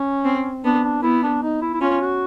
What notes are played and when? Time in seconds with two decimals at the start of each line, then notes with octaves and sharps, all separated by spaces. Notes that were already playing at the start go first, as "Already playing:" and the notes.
Already playing: C#4
0.25 C4
0.64 B3 D4
0.84 D4
1.03 B3 E4
1.23 D4
1.43 D#4
1.62 E4
1.74 E4
1.81 C#4 F4
2.01 F#4